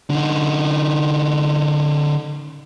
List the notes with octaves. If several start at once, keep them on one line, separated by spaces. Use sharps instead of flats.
D3 D#4